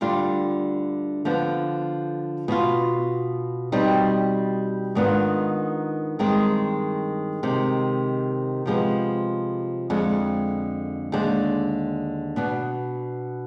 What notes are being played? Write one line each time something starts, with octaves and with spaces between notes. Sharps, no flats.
D2 D3 G3 D4 F4
D3 F3 B3
B2 B3 F4
B2 G3 C4 D#4
G#2 D#3 B3 D4 F4
G2 D#3 G#3 C4
C3 D#3 G#3
C3 F3 G#3 B3
F2 D3 G#3
D#2 D3 G#3 D4
B2 B3 D4